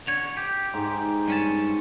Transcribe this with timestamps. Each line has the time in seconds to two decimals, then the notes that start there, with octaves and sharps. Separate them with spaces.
0.07 D3 C#5
0.37 G4
0.74 G#2
1.28 G2 C#4 A5